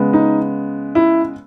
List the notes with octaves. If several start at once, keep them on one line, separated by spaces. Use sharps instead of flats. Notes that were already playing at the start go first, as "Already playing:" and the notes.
Already playing: C#3 G#3 B3
D#4
E4